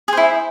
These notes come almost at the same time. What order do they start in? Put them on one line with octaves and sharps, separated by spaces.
G#4 C5 E4